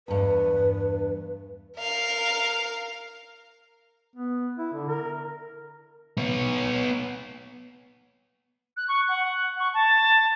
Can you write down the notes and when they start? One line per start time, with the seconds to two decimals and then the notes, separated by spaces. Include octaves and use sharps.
0.08 E2 G2 B4
1.78 A#4 F5
4.16 B3
4.58 E4
4.73 D3
4.88 A#4
6.18 B3 C#5
8.77 F#6
8.88 C#6
9.09 F#5
9.60 C#6
9.74 A5